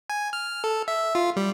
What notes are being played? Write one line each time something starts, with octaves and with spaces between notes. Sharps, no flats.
G#5
F6
A4
E5
F4
G3